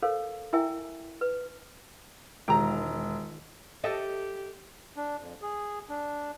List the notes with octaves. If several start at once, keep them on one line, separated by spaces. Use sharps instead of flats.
A4 A#4 C5 F5
E4 A#4 E5 G5 G#5
B4
E1 D#3 G#3 F4 G4 A#5
G4 A4 D#5 E5
D4
F2
G#4
D4